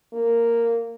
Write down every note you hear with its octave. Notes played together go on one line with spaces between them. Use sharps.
A#3